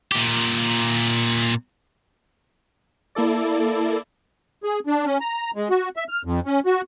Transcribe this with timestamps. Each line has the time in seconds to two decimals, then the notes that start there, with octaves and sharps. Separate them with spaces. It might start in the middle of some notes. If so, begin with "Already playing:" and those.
0.12 A#2 G4
3.15 A#3 E4 A4 D5
4.63 G#4
4.87 D4
5.06 C#4
5.20 A#5
5.56 G#3
5.70 F#4
5.96 E5
6.09 F6
6.25 F2
6.46 C#4
6.66 F#4